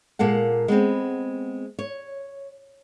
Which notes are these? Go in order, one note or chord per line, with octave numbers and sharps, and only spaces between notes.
A#2 G#3 A#3 A4 F#5
G#3 B3 C4
C#5